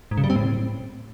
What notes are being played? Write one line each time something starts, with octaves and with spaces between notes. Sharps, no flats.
G#2
C#3
G3
C4
A2